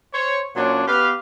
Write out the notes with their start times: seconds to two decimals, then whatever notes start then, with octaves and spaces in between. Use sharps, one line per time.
0.14 C5 C#5
0.56 A#2 F#3 C#4 D4 C5
0.88 B3 G4 B4 F5